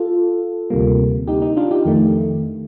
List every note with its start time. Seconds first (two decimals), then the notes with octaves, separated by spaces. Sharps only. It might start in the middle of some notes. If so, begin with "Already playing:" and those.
Already playing: F4 A4
0.70 D2 C3 G3 A#3
1.27 D#4 G4
1.42 D#4
1.57 D4 F4
1.71 D#4 G4
1.85 F2 D#3 A3